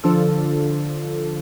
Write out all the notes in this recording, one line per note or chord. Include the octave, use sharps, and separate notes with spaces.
D3 F3 D4 F4 A4